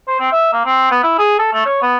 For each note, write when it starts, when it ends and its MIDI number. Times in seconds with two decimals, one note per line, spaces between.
0.07 0.19 72
0.20 0.28 60
0.32 0.50 76
0.53 0.63 58
0.65 0.88 60
0.91 1.02 59
1.03 1.13 64
1.18 1.38 68
1.39 1.50 69
1.53 1.65 57
1.66 1.81 73
1.82 1.98 59